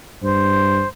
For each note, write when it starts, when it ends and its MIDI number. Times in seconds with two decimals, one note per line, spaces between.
0.23 0.82 43
0.23 0.88 72